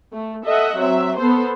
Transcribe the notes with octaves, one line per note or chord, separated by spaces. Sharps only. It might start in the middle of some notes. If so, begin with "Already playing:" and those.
A3
A4 D#5 E5 F#5
F#3 C4 E5
B3 A4 C5